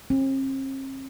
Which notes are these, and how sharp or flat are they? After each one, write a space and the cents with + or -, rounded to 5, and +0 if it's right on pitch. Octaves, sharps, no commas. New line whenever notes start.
C4 +45